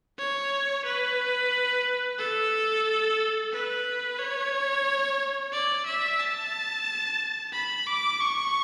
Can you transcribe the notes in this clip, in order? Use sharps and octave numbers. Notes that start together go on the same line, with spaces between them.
C#5
B4
A4
B4
C#5
D5
E5
A5
B5
D6
C#6